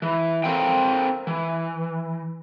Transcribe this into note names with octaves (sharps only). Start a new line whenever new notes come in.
E3
C4 A4 A#4 F5 G5
E3